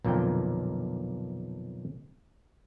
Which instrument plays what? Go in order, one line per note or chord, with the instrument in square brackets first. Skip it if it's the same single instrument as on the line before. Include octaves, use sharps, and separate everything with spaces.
[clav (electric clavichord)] B1 F2 A#2 D3 G5